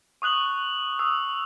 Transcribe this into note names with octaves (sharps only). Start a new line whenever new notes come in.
C#6 D#6 F#6 F#7
D#6 E6